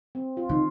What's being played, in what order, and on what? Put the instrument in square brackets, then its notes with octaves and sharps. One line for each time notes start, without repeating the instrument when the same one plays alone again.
[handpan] C4
F4
[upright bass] D#3